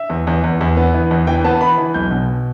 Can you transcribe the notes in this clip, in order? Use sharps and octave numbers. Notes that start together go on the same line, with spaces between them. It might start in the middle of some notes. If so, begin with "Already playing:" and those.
Already playing: E5
E2
E2
E2
E2
B3
E3
E2
E3 G5
B3 A5
E3 B5
E3
B1 G6
B2